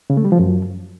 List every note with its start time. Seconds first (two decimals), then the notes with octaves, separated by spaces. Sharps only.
0.10 C#3
0.17 A3
0.25 G3
0.32 F3
0.39 F#2